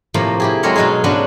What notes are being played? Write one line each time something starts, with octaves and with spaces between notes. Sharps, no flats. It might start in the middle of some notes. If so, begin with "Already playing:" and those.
A2 C3 F3 A#3
E4 G4 G#4
F#3 G#3 C4 A4 A#4 C#5
B2 F#3 G#3 D#4 G#4
G#2 C#3 F#3 B3 D4 F#4